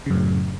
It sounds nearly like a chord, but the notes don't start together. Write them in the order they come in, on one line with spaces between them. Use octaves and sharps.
C#3 F#2 A2